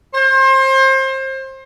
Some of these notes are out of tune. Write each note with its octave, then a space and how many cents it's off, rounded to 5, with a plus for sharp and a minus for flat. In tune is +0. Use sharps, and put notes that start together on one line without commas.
C5 +30